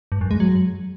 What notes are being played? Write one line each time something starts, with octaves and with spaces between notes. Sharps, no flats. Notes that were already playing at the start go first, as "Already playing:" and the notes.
G2
F#2
G#3
F#3